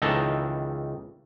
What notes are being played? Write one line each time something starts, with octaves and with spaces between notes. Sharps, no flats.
C#2 D#3 E3 A4 A#5